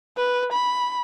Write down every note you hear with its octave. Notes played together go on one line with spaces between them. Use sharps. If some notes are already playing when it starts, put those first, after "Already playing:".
B4
B5